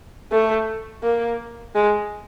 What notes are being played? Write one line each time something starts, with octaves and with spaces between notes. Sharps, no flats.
A3
A#3
G#3